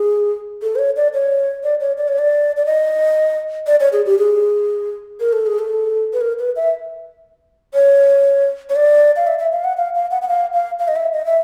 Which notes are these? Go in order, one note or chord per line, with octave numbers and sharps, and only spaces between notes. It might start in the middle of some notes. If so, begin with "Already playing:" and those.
Already playing: G#4
A4
C5
C#5
D5
C#5
D5
C#5
D5
C#5
D5
D5
D#5
D5
C#5
G#4
G4
G#4
A#4
A4
G#4
A4
B4
A#4
B4
E5
C#5
C#5
D5
F5
E5
E5
F5
F#5
F5
F5
F#5
F#5
F5
F5
F5
D#5
E5
D#5
E5